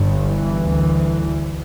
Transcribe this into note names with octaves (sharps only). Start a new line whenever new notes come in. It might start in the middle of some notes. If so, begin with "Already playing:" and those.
Already playing: G1 G2
E3
D2